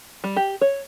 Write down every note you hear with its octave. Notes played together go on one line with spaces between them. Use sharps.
G3
G4
C#5